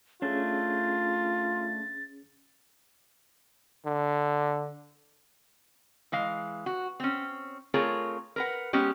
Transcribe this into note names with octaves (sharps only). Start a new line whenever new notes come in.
A3 C#4 D4 F4 G#4 A6
D3
E3 G#3 F5
F#4
C4 C#4
A3 C4 F4 G#4 A#4 C#5
A#4 B4 F#5
G#3 B3 C#4 G4